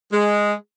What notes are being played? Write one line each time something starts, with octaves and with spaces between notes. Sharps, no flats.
G#3